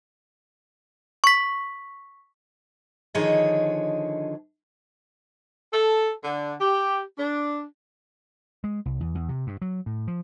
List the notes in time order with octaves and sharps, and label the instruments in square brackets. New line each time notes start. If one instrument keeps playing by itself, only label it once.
[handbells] C#6 B6
[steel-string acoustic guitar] D3 D#3 F3 G#4 C#5 D#5
[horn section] A4
D3
G4
D4
[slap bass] G#3
C2
E2
E2
C3
G2
F#3
A2
F3